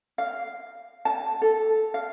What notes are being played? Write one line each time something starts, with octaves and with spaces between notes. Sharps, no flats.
F5
A5
A4
F5